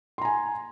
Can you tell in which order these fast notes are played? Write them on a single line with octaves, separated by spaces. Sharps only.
C6 A#5 G#5